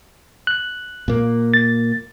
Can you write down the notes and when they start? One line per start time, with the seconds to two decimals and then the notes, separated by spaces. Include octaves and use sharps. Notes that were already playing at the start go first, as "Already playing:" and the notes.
0.47 F#6
1.08 A#2 A#3
1.54 A6